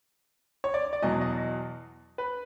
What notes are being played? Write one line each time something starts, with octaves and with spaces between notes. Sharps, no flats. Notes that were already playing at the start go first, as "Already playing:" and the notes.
C#5
D5
D5
E2 B2 F#3 D#5
D#5
B4